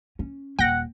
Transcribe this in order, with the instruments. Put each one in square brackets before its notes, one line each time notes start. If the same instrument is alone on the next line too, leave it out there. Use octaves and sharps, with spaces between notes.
[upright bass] C#4
[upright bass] D#1 [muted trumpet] F#5 [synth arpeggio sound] G5 A#6